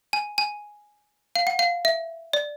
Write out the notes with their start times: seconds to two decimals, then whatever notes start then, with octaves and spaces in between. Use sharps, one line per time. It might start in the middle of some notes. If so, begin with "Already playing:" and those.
0.13 G#5
0.38 G#5
1.36 F5
1.47 F#5
1.59 F5
1.85 E5
2.33 D5